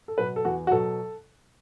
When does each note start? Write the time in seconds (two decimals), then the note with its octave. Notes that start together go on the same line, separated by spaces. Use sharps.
0.08 A4
0.18 B2 F#3 B4
0.36 A4
0.45 E2 F#4
0.67 F#4
0.71 B2 F#3 A4